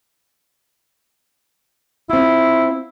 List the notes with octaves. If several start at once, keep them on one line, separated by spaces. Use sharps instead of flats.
C4 E4 F4